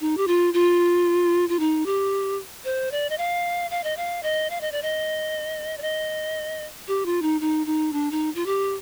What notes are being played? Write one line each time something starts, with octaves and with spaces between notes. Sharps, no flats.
D#4
G4
F4
F4
F4
D#4
G4
C5
D5
D#5
F5
F5
D#5
F5
D#5
F5
D#5
D5
D#5
D5
D#5
G4
F4
D#4
D#4
D#4
D4
D#4
F4
G4